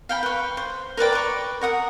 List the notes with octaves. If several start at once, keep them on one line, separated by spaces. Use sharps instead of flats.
F5 G5 B5
B4 C#6
C5
A#4 B4 D5 G5
B4 C#6
A#4 F#5 D#6